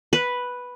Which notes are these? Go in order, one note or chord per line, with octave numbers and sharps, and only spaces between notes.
B4